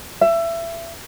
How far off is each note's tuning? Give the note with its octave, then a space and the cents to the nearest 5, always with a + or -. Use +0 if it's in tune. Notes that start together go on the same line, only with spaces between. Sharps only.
E5 +25